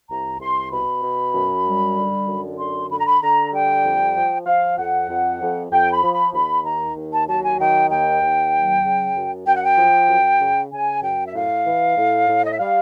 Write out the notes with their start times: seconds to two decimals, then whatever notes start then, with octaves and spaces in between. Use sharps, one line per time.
0.10 C2 A#5
0.40 C2 C6
0.71 B2 B5
1.03 B2
1.35 F#2
1.65 G3
1.97 D3
2.28 F#2
2.59 D3 C6
2.90 D3 B5
2.99 A#5
3.06 B5
3.21 D3 A#5
3.53 G3 G5
3.85 F2
4.16 F3
4.46 F3 F5
4.78 F2 F#5
5.09 F2
5.41 F2
5.71 F2 G5
5.92 B5
6.03 F3
6.14 B5
6.34 D#2 B5
6.65 D#3 A#5
6.97 D#2
7.13 A5
7.28 F#3 A5
7.43 G#5
7.59 D#3 G5
7.91 D#2 G5
8.22 D#2
8.53 F#3
8.84 C#3
9.16 F#2
9.47 F#2 G5
9.55 F#5
9.63 G5
9.78 F3
10.09 F#2
10.40 C#3
10.72 C#3 G#5
11.03 F#2 G5
11.27 E5
11.34 A2 F5
11.66 E3
11.97 A2
12.28 A2
12.44 D#5
12.52 E5
12.59 G3 F5